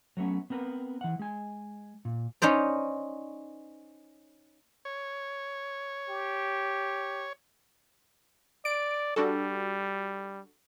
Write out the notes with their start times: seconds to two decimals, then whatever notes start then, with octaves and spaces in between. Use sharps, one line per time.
0.17 F#3 A3 B3 C#4
0.50 B3 C4 A#4 B4
1.01 E3 F#5
1.19 G#3 G#5
2.05 A#2
2.42 C#4 D#4 C5 D5
4.85 C#5
6.10 G4
8.65 D5 D7
9.16 G3 D4 F#4 A4